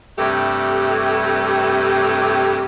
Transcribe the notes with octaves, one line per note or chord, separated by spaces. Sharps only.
G2 C3 A3 G4